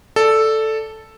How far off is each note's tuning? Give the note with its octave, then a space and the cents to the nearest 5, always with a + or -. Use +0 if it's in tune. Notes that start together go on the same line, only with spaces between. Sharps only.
A4 +0 D5 +0